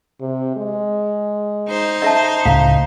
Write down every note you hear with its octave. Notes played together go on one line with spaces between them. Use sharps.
C3
G#3
D#4 C5
D#5 E5 A5
C#2 A2 F5 A#5